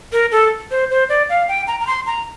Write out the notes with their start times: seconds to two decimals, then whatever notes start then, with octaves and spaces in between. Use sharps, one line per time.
0.12 A#4
0.32 A4
0.71 C5
0.91 C5
1.09 D5
1.29 F5
1.48 G5
1.67 A#5
1.80 A#5
1.87 C6
2.06 A#5